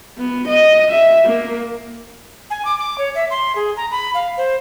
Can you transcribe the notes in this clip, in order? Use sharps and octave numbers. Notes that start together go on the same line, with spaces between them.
B3
D#5
E5
A#3
G#5
D6
D6
C#5
E5
C6
G#4
A#5
B5
F5
C5